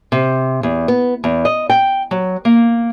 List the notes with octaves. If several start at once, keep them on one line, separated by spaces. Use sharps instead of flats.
C3
E2
B3
E2
D#5
G5
F#3
A#3